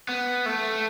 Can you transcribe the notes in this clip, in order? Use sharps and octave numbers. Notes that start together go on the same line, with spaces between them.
B3
A3